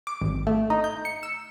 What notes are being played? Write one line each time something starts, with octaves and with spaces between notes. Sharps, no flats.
D6
G#1
A3
D#4
G6
C#7
E6